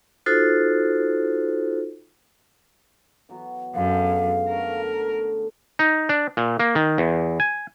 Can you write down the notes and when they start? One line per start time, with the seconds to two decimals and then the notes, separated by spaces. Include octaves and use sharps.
0.26 D#4 F4 F#4 A4 C5
3.29 E3 F#3 B3
3.75 F#2 D3 G#3 B3 F5
4.49 D3 A3 C#4 A#4
5.79 D#4
6.09 D4
6.37 A#2
6.59 A#3
6.75 D#3
6.98 E2
7.40 G#5